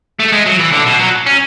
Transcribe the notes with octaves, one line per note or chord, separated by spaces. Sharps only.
A3
G#3
F#3
E3
D3
B2
F#3
C#4